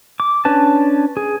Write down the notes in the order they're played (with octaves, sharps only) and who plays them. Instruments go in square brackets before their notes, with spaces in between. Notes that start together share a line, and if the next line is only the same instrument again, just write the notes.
[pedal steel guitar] D6
C#4 D4 B4 A5
G#4